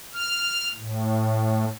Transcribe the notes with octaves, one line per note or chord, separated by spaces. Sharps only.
F6
A2